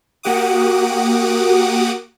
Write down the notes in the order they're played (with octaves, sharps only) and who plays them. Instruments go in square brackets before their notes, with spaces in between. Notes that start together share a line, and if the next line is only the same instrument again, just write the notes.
[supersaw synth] A#3 F#4 G4 F#5 D6 D#6